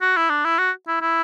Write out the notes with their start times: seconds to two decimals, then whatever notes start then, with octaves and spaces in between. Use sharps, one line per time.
0.02 F#4
0.17 E4
0.30 D4
0.45 E4
0.58 F#4
0.88 E4
1.02 E4